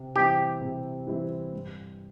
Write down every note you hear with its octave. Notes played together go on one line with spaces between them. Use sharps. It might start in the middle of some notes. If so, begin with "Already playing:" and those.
Already playing: C3
E3 G3 C4 E4 G4
C3
E3 G3 C4 E4
G2